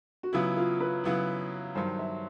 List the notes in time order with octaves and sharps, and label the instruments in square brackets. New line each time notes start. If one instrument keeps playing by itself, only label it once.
[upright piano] F#4
[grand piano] C#3 F#3 B3 E4 [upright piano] F4
[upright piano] F4
B4
[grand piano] C#3 F#3 B3 E4
[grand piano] G2 D#3 F#3 [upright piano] C5
[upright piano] E5